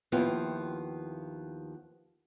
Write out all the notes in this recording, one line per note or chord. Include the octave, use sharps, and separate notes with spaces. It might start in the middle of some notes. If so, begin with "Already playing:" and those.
D#2 F3 B3 E4 F4 G5